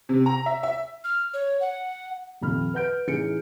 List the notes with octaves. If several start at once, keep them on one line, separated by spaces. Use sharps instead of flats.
C3
A#5
E5
E5
F6
C#5
F#5
D#1 F2 B5 F6
B4 F#5 G6 D7
A1 E3 D#4 G#4 C#7 D7